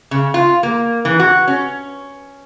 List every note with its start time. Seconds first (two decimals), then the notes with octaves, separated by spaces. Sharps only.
0.11 C#3
0.34 F4
0.63 A#3
1.05 E3
1.20 F#4
1.47 C#4